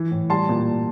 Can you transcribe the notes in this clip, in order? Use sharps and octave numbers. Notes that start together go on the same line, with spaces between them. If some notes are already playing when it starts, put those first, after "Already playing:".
Already playing: E3
A2
G3 A5 C6
A#2